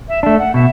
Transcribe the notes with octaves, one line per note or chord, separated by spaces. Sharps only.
E5
A3 D4 E5
F#5
B2 E5